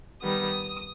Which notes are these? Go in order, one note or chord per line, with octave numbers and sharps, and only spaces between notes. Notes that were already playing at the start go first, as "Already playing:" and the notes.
D#3 G3 B3 D#6